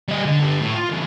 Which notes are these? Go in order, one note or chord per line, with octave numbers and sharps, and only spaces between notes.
G3 D#5
D3
D3 G3
A2
F4
C#3 E3